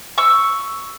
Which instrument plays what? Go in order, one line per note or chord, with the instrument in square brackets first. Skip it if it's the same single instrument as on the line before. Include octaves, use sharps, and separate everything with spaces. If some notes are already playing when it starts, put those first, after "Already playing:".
[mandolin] C#6 E6